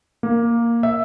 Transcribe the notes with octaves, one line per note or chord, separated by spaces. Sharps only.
A#3
E5